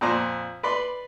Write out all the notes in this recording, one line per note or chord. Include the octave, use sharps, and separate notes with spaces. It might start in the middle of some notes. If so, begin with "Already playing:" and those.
F2 A#2 C5 D5 A#5
B4 D5 B5 C6